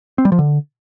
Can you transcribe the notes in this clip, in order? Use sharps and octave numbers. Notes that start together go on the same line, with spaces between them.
C4
G3
F3
D3